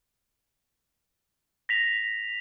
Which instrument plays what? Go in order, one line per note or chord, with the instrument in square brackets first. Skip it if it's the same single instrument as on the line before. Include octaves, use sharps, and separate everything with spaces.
[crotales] A#6 B6 F7